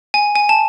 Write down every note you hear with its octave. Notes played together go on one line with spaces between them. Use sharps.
G#5
G#5
A5